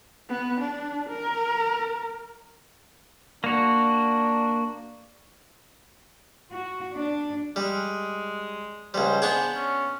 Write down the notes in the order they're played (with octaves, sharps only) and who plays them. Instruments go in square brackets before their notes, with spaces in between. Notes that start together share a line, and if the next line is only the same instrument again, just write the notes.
[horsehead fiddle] B3
D4
A#4
[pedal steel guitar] A#3 F#4 [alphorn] D4
[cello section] F#4
D4
[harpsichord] G3 [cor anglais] G#3
[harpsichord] C#2 G3 [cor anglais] C5
[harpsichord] B3 D4 G#4
[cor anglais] C#4